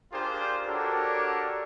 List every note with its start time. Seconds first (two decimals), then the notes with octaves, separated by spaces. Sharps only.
0.13 D4 F4 G4 G#4 A#4 C5
0.67 D4 F#4 G4 A4 A#4 C#5